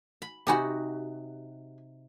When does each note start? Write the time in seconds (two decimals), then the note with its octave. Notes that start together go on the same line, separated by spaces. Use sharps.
0.22 B5
0.47 C3 D#4 F#4 G4 G#5 B5